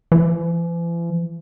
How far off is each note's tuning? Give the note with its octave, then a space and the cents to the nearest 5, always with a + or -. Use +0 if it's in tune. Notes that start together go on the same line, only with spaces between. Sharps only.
E3 +45